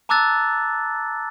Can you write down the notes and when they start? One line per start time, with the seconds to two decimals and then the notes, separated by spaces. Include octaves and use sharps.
0.09 A5 A#5 D6 E6 F#6 A6